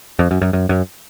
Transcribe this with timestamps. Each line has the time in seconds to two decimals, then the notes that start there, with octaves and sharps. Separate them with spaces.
0.19 F2
0.31 F#2
0.42 F#2
0.53 F#2
0.69 F#2